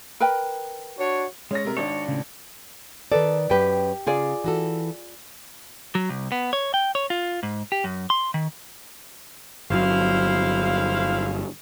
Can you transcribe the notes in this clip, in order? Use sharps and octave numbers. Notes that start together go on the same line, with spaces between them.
A#4 B4 G5
D4 F#4 C#5
G#3 C#4 C#5 A#6
C3 A#4
G#1 D4 C#5
A2 C#3
D#3 A4 B4 D5
F#2 G4 B4 G5
C#3 F4 G#4 D5
E3 F#4 A4
F#3
C2
B3
C#5
G5
C#5
F4
G#2
G4
F#2
C6
D#3
G1 F#3 E4 C5 F5